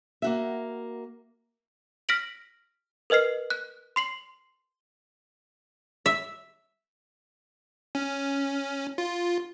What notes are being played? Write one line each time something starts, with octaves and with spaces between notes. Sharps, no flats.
A#3 F#4 E5
F6 A#6 B6 D7 F#7
A#4 B4 D#5 F6 C7
F#6
C6 C7 F#7
E5
C#4
F4